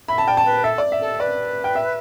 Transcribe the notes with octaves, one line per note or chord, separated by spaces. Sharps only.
E5 B5
A5
D5 G5
A5
B4
A4 E5
D5
E5
A4
B4 D5
G5
E5